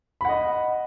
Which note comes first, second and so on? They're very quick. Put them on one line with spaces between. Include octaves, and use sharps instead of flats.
B5 F#5 D#5